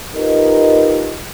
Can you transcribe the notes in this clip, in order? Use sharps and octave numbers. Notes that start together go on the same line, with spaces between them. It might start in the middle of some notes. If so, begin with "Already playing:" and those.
D#4 F4 G4 A#4 B4 D#5